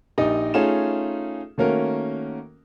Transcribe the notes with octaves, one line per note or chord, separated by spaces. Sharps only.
A#1 D#4 G4 D#5
A3 C#4 D#4 F4 G#4 E7
D#3 A3 A#3 C#4 F#4 A#4